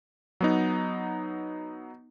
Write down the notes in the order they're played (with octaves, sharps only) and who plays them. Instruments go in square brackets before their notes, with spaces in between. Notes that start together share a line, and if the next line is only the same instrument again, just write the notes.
[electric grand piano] F#3 B3 D#4